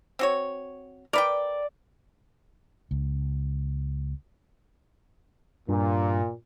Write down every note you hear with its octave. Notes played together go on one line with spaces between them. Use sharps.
C4 F#4 C#5
A#4 B4 D5 G5
C#2
G2 A#2